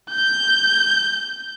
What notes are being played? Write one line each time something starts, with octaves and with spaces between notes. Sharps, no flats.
G6